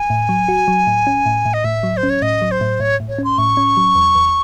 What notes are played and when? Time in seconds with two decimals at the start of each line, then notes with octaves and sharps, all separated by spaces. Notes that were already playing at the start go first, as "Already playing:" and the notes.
Already playing: G#5
0.10 A2
0.29 F#3
0.48 F#4
0.68 F#3
0.87 A2
1.07 C#4
1.26 A2
1.45 A2
1.54 D#5
1.64 A2 E5
1.83 F#3
1.97 C5
2.03 C#4
2.10 C#5
2.22 A2 D#5
2.42 F#3
2.51 C5
2.61 A2
2.80 A2 C#5
3.00 A2
3.09 C#5
3.18 C#4
3.24 C6
3.38 A2 C#6
3.57 C#4
3.77 F#3
3.95 E2
4.15 E2